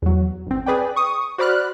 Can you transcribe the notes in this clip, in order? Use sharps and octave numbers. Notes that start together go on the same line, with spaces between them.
E2 F#3
G1 C4
G#4 B4 D5 G5
C#6 D#6
F#4 C5 D5 B5 F6 F#6